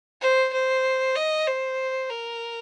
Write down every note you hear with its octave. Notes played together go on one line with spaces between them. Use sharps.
C5
C5
D#5
C5
A#4